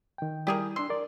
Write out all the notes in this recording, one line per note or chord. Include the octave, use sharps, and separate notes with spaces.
D#3 G5
G3 E4 G4 G#4 A#4
D4 C6 E6
A#4 D5